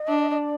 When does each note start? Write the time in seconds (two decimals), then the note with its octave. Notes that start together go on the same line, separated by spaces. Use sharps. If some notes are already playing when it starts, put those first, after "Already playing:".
Already playing: D#5
0.08 D4
0.31 D#5
0.37 D5